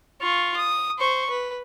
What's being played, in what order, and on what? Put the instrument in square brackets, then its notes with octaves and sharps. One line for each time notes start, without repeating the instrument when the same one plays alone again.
[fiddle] F4 C#6
D#6
C5 C#6
B4